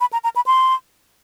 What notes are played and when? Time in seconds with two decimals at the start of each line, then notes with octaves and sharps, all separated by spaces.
0.01 B5
0.13 A#5
0.24 A#5
0.36 B5
0.46 C6